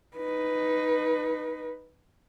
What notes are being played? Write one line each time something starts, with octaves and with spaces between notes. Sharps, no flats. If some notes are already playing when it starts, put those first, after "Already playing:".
D#4 B4